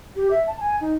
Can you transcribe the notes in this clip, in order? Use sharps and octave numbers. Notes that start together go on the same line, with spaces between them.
G4
E5
A5
G#5
D#4